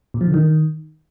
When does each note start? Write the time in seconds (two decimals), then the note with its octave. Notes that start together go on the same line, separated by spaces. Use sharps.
0.14 A#2
0.21 F3
0.27 D3
0.34 D#3